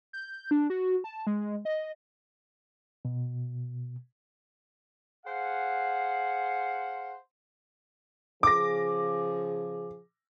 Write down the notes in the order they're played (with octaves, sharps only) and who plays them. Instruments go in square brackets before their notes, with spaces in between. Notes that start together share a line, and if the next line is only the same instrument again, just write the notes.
[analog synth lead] G6
D4
F#4
A5
G#3
D#5
[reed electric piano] B2
[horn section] G#4 C5 F5 F#5
[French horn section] C#3 F3 G#4 [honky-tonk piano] D6 A#6